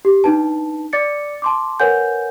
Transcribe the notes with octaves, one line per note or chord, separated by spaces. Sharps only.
G4
D4 D#4 B4 A5
D5 D6 A6 C#7
A5 C6 D6
A#4 B4 C#5 F#5 G#5 G6